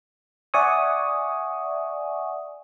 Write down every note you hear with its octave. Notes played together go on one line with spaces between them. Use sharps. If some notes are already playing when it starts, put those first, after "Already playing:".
D5 E5 F#5 G#5 C#6 D#6